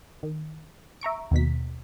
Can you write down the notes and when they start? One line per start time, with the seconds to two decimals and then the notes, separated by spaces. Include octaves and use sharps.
0.23 D#3
1.01 E5 A#5 C#6 D7
1.31 D#2 B2 B6